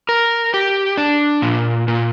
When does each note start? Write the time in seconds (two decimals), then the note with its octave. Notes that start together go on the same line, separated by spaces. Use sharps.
0.09 A#4
0.54 G4
0.98 D4
1.42 A#2
1.88 A#2